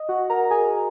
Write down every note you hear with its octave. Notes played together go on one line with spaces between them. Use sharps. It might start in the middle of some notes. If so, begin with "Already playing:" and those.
Already playing: D#5
F#4 F#5
A#4 A#5
G#4 G#5